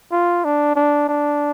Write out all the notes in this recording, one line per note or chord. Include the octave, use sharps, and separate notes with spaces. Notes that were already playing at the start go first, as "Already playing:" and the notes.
F4
D4
D4
D4